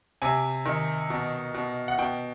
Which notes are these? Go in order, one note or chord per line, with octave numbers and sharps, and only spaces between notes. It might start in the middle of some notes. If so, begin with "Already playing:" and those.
C3 G#5
D#3
B2
B2
F#5
B2 G5